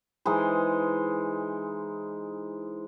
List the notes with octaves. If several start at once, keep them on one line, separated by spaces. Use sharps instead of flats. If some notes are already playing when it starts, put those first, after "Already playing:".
E3 G#3 D#4 C5